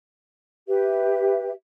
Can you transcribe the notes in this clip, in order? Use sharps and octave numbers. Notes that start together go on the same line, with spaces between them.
G4 B4 E5